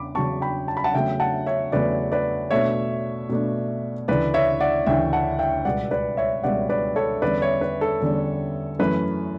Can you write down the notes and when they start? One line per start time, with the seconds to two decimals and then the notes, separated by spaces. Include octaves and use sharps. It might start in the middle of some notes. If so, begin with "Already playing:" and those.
Already playing: E2 C#3 C#4 B5 D6
0.15 E2 C#3 F#3 C#4 A5 C#6
0.42 G5 B5
0.68 A5
0.77 B5
0.84 F#5 A5
0.94 E2 C#3 F#3 A3 E5 G5
1.20 F#5 A5
1.46 C#5 E5
1.72 E2 C#3 F#3 A3 B4 D5
2.12 B4 D5
2.51 B2 A3 D4 C#5 E5
3.29 B2 A3 D4
4.08 D2 C#3 E3 B4 D5
4.34 C#5 E5
4.61 D5 F#5
4.86 D2 C#3 E3 E5 G5
5.13 F#5 A5
5.39 E5 G5
5.65 C#2 B2 G3 B3 D5 F#5
5.91 B4 D5
6.17 C#5 E5
6.44 C#2 B2 G3 B3 D5 F#5
6.69 B4 D5
6.96 A4 C#5
7.22 E2 D3 G3 C#4 B4 D5
7.42 C#5 E5
7.61 B4
7.81 A4
8.01 E2 D3 G3 C#4
8.79 F#2 E3 A3 C#4 B4